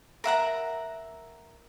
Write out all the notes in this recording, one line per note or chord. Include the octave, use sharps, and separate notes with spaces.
A#4 E5 F#5 A#5